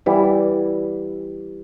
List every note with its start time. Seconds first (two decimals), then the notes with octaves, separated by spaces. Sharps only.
0.06 E3 G3 B3 E4